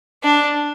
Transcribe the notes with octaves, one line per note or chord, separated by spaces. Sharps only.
D4